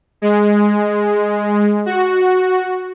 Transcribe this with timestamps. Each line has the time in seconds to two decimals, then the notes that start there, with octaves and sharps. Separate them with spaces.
0.22 G#3
1.86 F#4